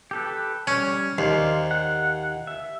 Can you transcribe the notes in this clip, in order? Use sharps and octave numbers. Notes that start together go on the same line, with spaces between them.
G4 A4 B4
G3 C#4
D#2 C5 D5 F5
F#5
E5